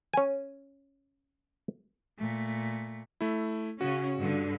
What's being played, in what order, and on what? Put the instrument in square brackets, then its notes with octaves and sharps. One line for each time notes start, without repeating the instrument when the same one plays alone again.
[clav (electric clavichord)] C#4 G#5
[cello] A#2 A3
[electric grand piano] A3 E4
[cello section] C#3 C#4 [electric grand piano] F#4
[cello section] G2 D3